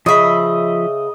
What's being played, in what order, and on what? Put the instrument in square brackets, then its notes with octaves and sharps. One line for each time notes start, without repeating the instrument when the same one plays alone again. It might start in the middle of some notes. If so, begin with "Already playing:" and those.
[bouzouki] C#3 E5 [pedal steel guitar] F3 B5 [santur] D#5